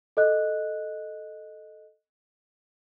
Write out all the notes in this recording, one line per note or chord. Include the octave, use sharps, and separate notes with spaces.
A4 D#5 F#6